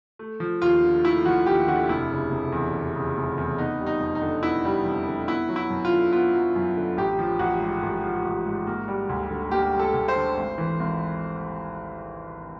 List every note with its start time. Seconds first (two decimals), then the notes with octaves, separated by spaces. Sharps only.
0.19 A3
0.40 F3
0.62 D#2 F4
0.84 D3
1.04 A3 E4
1.25 F3 F#4
1.46 D#2 G4
1.67 D3 F#4
1.89 F1 E4
2.11 C#3
2.31 F1
2.52 E2
2.73 F1
2.95 C#3
3.17 F1
3.38 E2
3.58 B3 D#4
3.80 G3
3.86 D#4
4.00 F2
4.15 D#4
4.22 D3
4.43 B3 E4
4.65 G3
4.85 F2
5.07 D3
5.28 B3 E4
5.49 F#3
5.56 E4
5.70 F#2
5.85 F4
5.91 D3
6.12 B3 F4
6.35 F#3
6.56 F#2
6.77 D3
6.97 A1 G4
7.19 F3
7.39 A1 F#4
7.61 G#2
7.83 A1
8.03 F3
8.25 A1
8.46 G#2
8.67 A#3
8.88 G3
9.09 D2
9.30 D3
9.51 A#3 G4
9.74 G3
9.79 A4
9.94 D2
10.08 C5
10.16 D3
10.37 G#1
10.58 E3
10.79 G#1